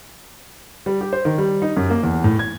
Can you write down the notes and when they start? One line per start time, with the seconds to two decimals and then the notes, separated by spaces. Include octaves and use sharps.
0.86 G3
1.01 G4
1.13 C5
1.25 D#3
1.38 G3
1.62 D#4
1.77 F#2
1.90 A#3
2.03 E2
2.24 A2
2.39 G#6